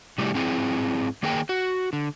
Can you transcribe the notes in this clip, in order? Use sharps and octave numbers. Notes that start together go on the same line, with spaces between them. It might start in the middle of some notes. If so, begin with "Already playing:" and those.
C3 G3 A3 E4 G4
G#2 C4 E4 G#4 B4
D#3 A#3 G#4 A#4 G5 G#5
F#4
D3